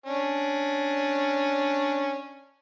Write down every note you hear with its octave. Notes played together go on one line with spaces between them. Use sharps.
C#4 D4